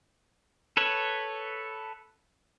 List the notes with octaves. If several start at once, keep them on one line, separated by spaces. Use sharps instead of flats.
A4 B4 C#5